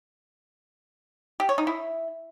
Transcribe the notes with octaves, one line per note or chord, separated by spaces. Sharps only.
G4
C#5
D#4
E4